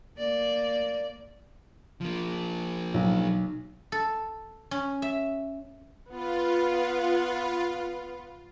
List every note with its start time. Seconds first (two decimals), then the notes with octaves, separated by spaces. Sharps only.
0.18 A#3 D5
2.01 F3 A#3
2.94 B1
3.92 A4
4.71 C#4
5.02 E5
6.10 B3 F4 B4